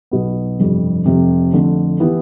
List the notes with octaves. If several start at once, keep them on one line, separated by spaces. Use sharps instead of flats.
B1 B2 B3
G1 F2 C3 G3
F1 F2 C3
F2 D3 A3
E3 B3 E4 G4